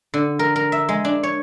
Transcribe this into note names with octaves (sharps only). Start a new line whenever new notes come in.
D3
A#4
A#4
E5
G#3
D4
C#5